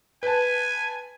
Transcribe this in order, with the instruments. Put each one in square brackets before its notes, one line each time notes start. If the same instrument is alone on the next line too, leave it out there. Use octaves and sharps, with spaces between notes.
[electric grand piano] B4 A5 [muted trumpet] G#5